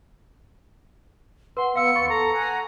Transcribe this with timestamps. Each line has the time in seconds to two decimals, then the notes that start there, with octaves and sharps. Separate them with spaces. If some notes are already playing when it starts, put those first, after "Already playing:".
1.57 B4 F#5 C6
1.76 B3 F5 C6 E6 C#7
1.95 D#2 B3 B5 C#6 A6
2.09 A4 A#5
2.33 F#5 G#5